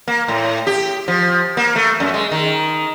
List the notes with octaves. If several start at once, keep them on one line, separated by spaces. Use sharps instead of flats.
A#3
A2
G4
F3
A#3
A3
F#2
G#3
D#3